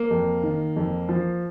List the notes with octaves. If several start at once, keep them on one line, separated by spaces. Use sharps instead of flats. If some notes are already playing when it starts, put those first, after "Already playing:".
Already playing: A#3
F2
D#3
F2
F3